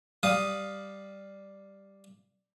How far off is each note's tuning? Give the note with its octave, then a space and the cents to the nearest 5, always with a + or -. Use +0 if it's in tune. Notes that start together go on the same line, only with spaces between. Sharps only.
G3 +0 F5 +0 D#6 +0